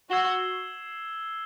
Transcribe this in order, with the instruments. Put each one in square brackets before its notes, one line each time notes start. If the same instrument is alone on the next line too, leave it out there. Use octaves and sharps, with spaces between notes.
[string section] F#4 [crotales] E6 G#6 C7 E7 G7